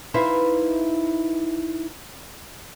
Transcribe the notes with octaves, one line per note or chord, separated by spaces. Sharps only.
D#4 E4 B4 C5 E5 F5